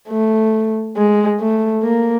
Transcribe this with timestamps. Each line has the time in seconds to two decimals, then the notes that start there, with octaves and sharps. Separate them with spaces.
0.09 A3
0.96 G#3
1.40 A3
1.83 A#3